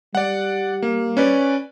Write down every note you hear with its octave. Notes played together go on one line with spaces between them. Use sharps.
G3 D5 F#5
A#3
C#4 B4 D5